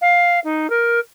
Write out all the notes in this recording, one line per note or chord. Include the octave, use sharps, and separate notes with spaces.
F5
D#4
A#4